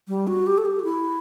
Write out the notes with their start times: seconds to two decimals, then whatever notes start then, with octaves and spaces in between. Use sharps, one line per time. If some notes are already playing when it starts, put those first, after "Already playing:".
0.08 G3
0.27 F#4
0.47 G4
0.58 A4
0.65 G4
0.79 F#4
0.84 E4